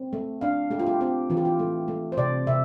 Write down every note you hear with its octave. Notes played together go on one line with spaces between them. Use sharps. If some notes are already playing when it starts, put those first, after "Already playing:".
Already playing: C4
A3
D4 F5
A3 G4
F4
G4
C4 G4
E3 F4
G4
F4
A3
A3
C5
C3 D5
C3 E5